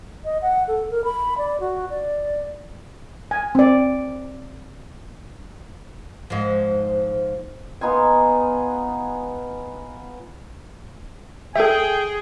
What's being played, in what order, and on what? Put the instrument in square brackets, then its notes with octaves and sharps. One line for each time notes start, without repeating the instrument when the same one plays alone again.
[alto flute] D#5
F#5
A4
A#4
B5
D5
F#4
D5
[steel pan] G#5
C4 D5
[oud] G#2 F3
[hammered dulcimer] B3 D#4 F4 G#5
[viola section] G#4 [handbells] A4 E5 [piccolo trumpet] G5